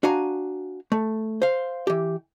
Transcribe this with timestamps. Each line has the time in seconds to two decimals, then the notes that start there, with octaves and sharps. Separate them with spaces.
0.03 D4 F#4 F5 G#5 A#5
0.92 A3
1.42 C5 F5
1.87 E3 G4